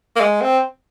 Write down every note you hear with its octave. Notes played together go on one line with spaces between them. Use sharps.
A#3
G#3
C4